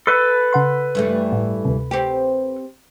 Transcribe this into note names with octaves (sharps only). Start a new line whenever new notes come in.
A4 B4 B5
C#3 F#5 C6
G2 E3 A3
G1 A2
D2 C3
C4 G4